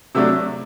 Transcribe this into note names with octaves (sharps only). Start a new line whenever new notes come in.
C3 F#3 A3 D4 E6